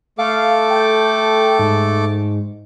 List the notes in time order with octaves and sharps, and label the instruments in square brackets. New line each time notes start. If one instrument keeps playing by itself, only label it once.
[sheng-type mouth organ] A3 A4 D6 [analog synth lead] F5
[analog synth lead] G5
G#2